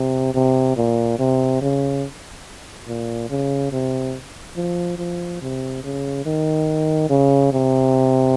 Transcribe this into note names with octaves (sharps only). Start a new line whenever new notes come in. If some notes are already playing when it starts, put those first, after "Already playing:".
Already playing: C3
C3
A#2
C3
C#3
A#2
C#3
C3
F3
F3
C3
C#3
D#3
C#3
C3